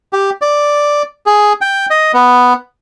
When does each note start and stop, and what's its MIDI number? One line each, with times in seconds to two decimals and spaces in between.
0.13 0.30 67
0.42 1.03 74
1.26 1.53 68
1.61 1.86 79
1.90 2.12 75
2.14 2.53 59